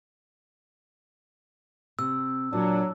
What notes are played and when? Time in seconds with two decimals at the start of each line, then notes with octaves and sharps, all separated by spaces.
1.99 C3 E6
2.53 A#2 F#3 D4